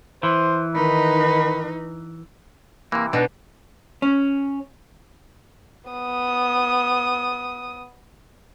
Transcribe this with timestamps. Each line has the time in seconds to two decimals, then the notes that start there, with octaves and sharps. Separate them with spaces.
0.23 E3 C5
0.75 D#3 D#4 B4 B5
2.92 C3 E3 A#3
3.13 B2 D4 D#4
4.02 C#4
5.90 B3 D#6